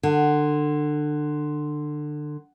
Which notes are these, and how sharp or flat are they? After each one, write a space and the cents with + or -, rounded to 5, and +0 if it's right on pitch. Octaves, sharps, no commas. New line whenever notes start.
D3 +25